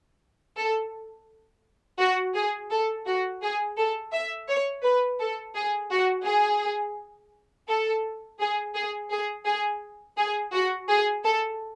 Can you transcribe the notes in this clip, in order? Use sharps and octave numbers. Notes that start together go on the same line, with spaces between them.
A4
F#4
G#4
A4
F#4
G#4
A4
E5
C#5
B4
A4
G#4
F#4
G#4
A4
G#4
G#4
G#4
G#4
G#4
F#4
G#4
A4